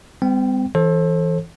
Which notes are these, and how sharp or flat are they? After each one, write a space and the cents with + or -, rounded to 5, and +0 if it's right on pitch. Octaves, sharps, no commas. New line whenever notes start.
G3 +40 C4 -40 G5 +0
E3 +0 A4 +0 C5 +35